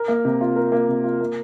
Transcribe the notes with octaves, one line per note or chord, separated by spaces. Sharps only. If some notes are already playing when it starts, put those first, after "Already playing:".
Already playing: A#4
A#3
C3
F4
A#4
A#3
C3
F4
A#3